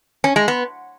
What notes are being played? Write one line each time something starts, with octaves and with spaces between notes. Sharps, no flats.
C#4
G#3
B3